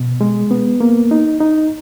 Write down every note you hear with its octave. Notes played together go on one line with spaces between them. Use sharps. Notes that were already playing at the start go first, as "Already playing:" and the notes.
Already playing: B2
G#3
B3
A#3
D#4
D#4